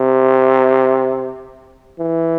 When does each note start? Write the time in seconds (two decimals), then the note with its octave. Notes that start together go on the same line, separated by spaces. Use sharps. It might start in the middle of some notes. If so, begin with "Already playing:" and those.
Already playing: C3
1.99 E3